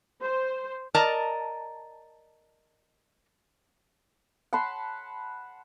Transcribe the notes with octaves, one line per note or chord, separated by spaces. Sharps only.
C5
A#4 D5 D#5 A5 A#5
F#5 A5 B5 C6